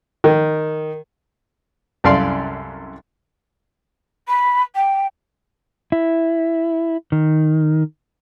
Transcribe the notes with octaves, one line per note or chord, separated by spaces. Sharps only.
D#3
C2 F#2 A4 D5 F5 C6
B5
G5
E4
D#3